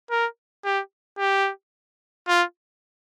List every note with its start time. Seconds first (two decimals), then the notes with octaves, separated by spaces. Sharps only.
0.11 A#4
0.65 G4
1.19 G4
2.28 F4